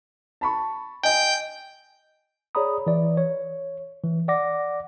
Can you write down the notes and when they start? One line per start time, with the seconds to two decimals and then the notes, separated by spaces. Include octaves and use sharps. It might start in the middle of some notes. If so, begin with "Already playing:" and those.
0.41 A5 B5 C#6
1.03 D#5 G5 G#5 G6
2.55 G#4 C#5 D5 A#5 B5 D#6
2.87 E3 D5
3.17 C#5
4.04 E3
4.28 D5 F#5 D6 A#6